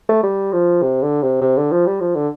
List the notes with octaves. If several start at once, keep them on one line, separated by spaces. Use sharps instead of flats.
A3
G3
F3
C3
D3
C3
C3
D3
F3
G3
F3
D3